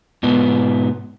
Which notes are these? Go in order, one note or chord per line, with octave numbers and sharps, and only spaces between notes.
G#2 B2 B3